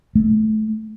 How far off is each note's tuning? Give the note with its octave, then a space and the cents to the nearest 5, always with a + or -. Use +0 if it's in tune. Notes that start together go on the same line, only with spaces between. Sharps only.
A3 -25